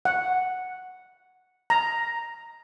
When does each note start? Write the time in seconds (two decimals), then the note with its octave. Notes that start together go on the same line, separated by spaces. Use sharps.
0.05 F#5
1.70 A#5